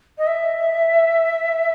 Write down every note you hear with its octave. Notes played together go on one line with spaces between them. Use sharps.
D#5
E5